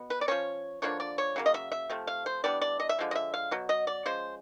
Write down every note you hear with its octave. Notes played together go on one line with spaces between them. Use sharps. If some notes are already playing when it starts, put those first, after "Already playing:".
Already playing: B2 B3
B4
D5
F3 A#3 C#4 C#5
D3 F3 A#3 D4 C#5
D5
C#5
C#3 F#3 A#3
D#5
E5
E5
C3 F3 A3
F5
C5
E3 G3 B3 D4 D5
D5
D#5
E5
D3 F3 G#3
D#5
E5
F5
B2 F#3
D#5
D5
F3 G#3 C#4 C5